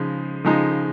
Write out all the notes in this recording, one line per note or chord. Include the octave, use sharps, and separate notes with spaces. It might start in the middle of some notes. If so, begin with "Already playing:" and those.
Already playing: C#3 F3 G#3 D#4
C#3 F3 G#3 D#4